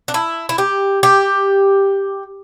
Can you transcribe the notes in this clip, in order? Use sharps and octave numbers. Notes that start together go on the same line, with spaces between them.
D4
E4
E4
G4
G4